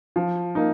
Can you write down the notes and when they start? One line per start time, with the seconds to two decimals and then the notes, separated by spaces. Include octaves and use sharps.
0.16 F3
0.55 A#3 D#4